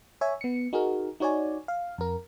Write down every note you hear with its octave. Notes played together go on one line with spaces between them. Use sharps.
C#5 E5 G#5
B3 C#7
D#4 F#4 G#4 A#4
D#4 F#4 C#5 D5 G#5
F5
F2 A#4